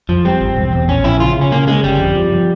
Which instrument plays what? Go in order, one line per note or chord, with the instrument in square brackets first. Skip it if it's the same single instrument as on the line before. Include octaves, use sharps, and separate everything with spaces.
[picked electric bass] F2 [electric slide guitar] F3
[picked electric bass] G3 [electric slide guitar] C4
[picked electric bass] G#1
E1
E2
[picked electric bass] A#1 [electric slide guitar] C#4
[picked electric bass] A#1 [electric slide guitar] E4
[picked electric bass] C#3 [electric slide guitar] F4
[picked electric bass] C#3
[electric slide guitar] C#4
[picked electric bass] C#3 [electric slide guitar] A#3
[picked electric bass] C#3 [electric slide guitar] G#3
[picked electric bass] G1 [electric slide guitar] G3
[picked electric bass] F2
F3
F3